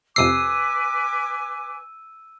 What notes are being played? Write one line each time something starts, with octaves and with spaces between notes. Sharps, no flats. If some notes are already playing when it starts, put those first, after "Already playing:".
F2 C3 B4 G#5 D6 E6 C7 D#7